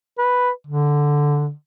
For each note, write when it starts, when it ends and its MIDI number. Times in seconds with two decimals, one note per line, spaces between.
0.18 0.50 71
0.67 1.51 50